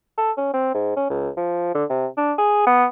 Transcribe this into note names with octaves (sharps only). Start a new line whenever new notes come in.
A4
C#4
C4
G#2
C#4
C#2
F3
D3
C3
D4
G#4
B3